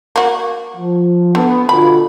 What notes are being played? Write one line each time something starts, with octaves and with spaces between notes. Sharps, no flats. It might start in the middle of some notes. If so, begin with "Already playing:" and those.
A#3 F#4
F3
D3 B3
B2 D3 F4 B5